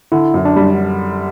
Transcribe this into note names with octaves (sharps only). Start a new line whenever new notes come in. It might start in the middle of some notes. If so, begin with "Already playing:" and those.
D3 E4
F#2
D4
G3